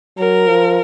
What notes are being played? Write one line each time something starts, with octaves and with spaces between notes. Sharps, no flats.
F#3 A#4
F3